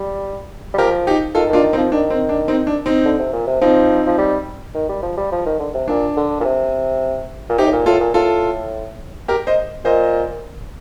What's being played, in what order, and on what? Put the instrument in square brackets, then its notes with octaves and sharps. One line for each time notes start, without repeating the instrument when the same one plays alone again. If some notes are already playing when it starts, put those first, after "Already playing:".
Already playing: [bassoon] G3
G3
[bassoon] F3 [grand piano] G4 A#4
[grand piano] D#4 G4
[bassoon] D#3 [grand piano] F4 A4
[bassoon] D#3 [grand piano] D4 F4
[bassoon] D#3
[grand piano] C4 D#4
[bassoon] F3
[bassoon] D#3 [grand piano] D4
[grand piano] C4
D4
C4 D#4
D4
C4 D#4
[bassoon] D3
C3
A#2
C3
[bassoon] F3 [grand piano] C4 D#4
[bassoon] F3
G3
D#3
G3
F3
G3
F3
D#3
D3
C3
[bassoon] A#2 [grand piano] D4
[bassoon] D3
A#2
C3
A#2
[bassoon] C3 [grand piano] D#4 G4
[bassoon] A2
A#2
[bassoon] A2 [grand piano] F4 A4
[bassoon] A#2
[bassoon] A2 [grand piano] F4 A4
[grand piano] G4 A#4
C5 D#5
[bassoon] A#2 [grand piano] C5 D#5